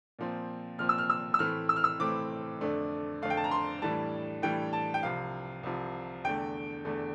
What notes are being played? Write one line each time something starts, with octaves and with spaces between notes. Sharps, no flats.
A#2 F3 C4
A#2 F3 C4 F6
E6
F6
E6
E6
A2 E3 A3 C4 F6
E6
F6
E6
A2 E3 A3 C4 D6
F2 D3 A3 D4
F2 D3 A3 D4 F5
G5
A5
A#5
C6
A2 E3 G3 D4 A5
A2 E3 G3 D4 G5
A5
G5
C2 C3 F3 F5
C2 C3 F3
E2 D3 A3 G5
E2 D3 A3